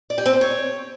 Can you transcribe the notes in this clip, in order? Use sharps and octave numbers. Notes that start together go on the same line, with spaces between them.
D5
G4
C4
C5
C#5